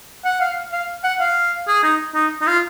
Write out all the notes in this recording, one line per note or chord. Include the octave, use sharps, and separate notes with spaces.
F#5
F5
F5
F#5
F5
G#4
D#4
D#4
D#4
F4